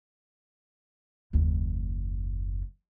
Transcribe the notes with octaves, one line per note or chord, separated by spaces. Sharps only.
F#1 D#2